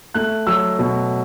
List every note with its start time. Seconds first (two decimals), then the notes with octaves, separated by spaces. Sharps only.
0.14 A3 F#6
0.47 F#3 E6
0.79 B2